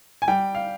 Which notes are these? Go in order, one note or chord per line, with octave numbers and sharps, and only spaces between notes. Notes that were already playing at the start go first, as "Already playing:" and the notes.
G#5
G3 G5
F5